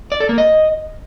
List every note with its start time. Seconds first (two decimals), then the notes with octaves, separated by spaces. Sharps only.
0.12 D5
0.20 A4
0.29 A#3
0.38 D#5